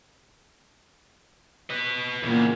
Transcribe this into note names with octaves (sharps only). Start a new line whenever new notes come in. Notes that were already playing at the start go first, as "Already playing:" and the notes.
B4 D#5
E2 A#2 C#3